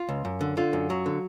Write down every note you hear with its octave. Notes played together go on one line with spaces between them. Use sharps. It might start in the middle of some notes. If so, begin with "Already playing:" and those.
Already playing: F4
C#2
F#2
D3
D3 F4
F#2
F#3
D3